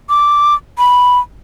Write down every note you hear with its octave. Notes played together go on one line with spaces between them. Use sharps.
D6
B5